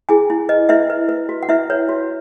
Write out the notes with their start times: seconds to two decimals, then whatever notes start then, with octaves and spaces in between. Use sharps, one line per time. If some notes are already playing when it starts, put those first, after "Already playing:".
0.09 E4 G#4 G#5
0.30 E4
0.49 B4 D#5
0.69 E4 B4 E5
0.90 B4
1.09 B4
1.29 F#4
1.43 F#5
1.49 E4 B4 E5
1.70 B4 C#5
1.89 F#4